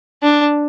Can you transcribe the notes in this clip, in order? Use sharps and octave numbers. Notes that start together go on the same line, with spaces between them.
D4